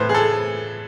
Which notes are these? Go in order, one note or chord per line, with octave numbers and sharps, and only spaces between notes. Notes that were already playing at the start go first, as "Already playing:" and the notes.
Already playing: A2 E3 B4 C5
G#4
A4